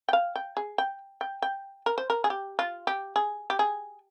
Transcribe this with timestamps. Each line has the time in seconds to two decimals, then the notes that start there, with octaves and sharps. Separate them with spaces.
0.09 G5
0.13 F5
0.36 G5
0.57 G#4
0.78 G5
1.21 G5
1.42 G5
1.86 A#4
1.98 C5
2.10 A#4
2.24 G#4
2.30 G4
2.59 F4
2.87 G4
3.16 G#4
3.50 G4
3.59 G#4